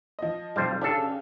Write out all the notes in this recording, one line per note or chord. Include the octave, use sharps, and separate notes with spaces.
F3 D#5
B1 F2 G3 C5
C#3 C#4 D4 G4 A4